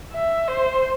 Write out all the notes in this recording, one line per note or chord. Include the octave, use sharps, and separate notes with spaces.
E5
C5